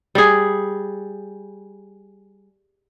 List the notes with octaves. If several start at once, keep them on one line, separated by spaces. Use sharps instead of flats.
G3 G#4